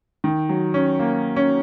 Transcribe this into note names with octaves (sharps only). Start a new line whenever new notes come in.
D#3
F#3
C#4
A#3
C#4